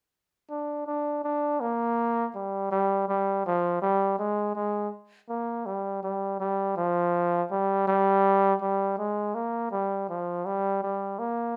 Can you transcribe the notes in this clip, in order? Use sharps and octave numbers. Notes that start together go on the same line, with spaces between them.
D4
D4
D4
A#3
G3
G3
G3
F3
G3
G#3
G#3
A#3
G3
G3
G3
F3
G3
G3
G3
G#3
A#3
G3
F3
G3
G3
A#3